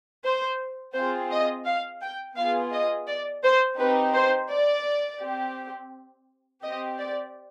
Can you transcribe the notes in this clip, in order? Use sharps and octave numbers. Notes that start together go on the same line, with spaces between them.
C5
C4 F4 G#4 C5
D#5
F5
G5
B3 F4 G#4 F5
D#5
D5
C5
C4 D#4 G4 B4
C5
D5
C4 G4
C4 G4 D#5
D5